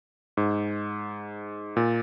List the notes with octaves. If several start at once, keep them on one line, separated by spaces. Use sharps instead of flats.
G#2
A#2